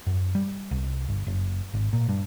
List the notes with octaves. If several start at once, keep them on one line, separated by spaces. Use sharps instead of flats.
F#2
G3
C2
G1
F#1
G#1
A#2
G2